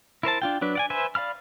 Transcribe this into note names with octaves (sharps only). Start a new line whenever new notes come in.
E4 A#4 C5 A5
D4 F4 G5
F#3 D4 B4
D5 F#5 G#5
B4 C5 E5 G#5
D5 F5 B5 F6